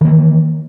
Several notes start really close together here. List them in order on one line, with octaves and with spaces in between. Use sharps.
D#3 A#3 E3